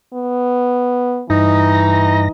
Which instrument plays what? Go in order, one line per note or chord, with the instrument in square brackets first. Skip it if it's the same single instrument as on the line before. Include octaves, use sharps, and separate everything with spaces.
[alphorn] B3
[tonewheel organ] G2 A#6 [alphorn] E3 [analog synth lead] D#4